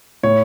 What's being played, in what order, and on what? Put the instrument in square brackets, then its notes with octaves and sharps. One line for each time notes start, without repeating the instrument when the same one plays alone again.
[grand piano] A2 C#5